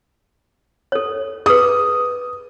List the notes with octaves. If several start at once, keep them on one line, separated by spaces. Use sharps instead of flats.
A4 C#5
G#4 B4 D#6